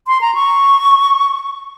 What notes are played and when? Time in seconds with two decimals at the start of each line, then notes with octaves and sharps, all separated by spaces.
0.07 C6
0.21 A#5
0.35 C#6